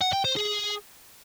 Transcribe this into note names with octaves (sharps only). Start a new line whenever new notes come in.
F#5
G5
C5
G#4